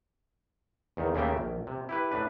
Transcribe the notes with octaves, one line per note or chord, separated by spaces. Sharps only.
E2 D#3
D#2 C#3 A3 A#3 E5 G5
A#1
C3
E4 G4 B4
A2 D4 B4